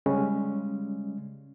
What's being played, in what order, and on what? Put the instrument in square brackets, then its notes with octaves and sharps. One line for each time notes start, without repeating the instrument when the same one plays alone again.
[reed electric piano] C#3 G3 G#3 C#4